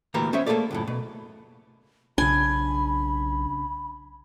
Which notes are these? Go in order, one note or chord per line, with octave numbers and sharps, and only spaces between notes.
D2 A#2 E3 G4 A#4 A#5
B3 C#4 C5 C#5 E5
A3 A#3 F4 G#4 A4 D5
C#2 F#2 A2
B2
B1 C#3 D4 G#5 B5